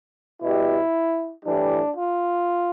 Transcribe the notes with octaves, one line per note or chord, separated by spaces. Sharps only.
B2 G3 E4
A2 E3 G3 D4
F4